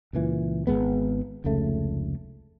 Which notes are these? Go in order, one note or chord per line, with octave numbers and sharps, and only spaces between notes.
C#2 A#2 E3
G#1 G#2 G#3 B3
F1 C#2 C#3 A3